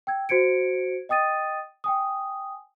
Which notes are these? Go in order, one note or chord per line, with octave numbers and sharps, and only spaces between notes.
G5 E6 G#6
F#4 C5 G#6 C#7 D7
D#5 G5 D#6 A6 D#7
G5 G#5 D#6